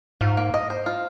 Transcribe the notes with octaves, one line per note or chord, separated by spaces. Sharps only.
G#2 F4
A#3
D#5
C5
F4